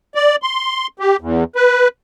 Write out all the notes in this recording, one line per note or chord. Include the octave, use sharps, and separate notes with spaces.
D5
C6
G4
E2
B4